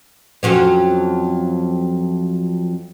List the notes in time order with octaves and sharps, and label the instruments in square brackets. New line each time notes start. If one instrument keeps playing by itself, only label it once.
[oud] F2 F#3 C#4